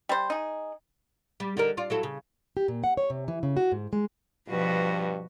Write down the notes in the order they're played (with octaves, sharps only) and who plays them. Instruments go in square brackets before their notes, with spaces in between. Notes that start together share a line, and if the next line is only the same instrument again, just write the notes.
[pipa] G3 C5
D#4 G#4
[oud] G3
D3 D#4 A#4
D4 F4
F#3 E4 A4
C#3
[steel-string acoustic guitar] G4
A#2
F#5
C#5
C3
E3
C#3
F#4
G#2
G#3
[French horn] G2 [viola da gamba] B2 F#4 B4 [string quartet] F3